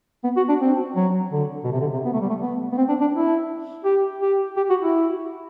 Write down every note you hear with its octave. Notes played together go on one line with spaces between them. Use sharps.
B3
F#4
D4
C4
F#3
D3
B2
C3
D3
C3
B3
A3
G3
A3
B3
B3
C4
D4
D4
E4
G4
G4
G4
F#4
E4